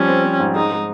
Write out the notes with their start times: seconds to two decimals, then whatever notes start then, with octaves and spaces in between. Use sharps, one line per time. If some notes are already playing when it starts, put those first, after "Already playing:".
Already playing: F3 G3 C#4
0.08 C4
0.24 C4
0.40 G#2
0.55 G#3 D#4
0.72 G#3